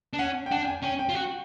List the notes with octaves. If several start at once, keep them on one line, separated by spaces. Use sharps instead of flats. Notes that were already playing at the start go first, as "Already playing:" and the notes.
D4
C#4 F#5
G5
D4 F#5
G5
G#5
C#4 G5
G5
F4
F#4